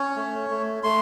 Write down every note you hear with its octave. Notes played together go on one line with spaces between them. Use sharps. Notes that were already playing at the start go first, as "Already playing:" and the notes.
Already playing: C#4 C#5
A3
A3
A3 C6